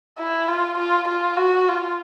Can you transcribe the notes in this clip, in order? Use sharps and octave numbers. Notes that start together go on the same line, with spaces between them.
E4
F4
F4
F4
F#4
F4